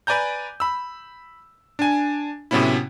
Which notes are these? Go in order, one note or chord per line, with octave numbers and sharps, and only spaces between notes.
B4 D5 G#5 A#5 G6
B5 E6
D4 G#5
A2 C3 F#3 B3 C#4 E4